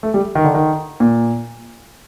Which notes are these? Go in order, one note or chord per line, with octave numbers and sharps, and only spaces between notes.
A3
G3
D#3
D3
D#3
A#2